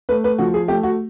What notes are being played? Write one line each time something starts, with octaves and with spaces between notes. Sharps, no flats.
A3 B4
B4
F3 F#4
G#4
A3 G4
F#4